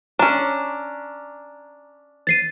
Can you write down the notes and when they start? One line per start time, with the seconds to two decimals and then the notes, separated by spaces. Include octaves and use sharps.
0.19 C#4 D4 A#5
2.27 A6 C7 D#7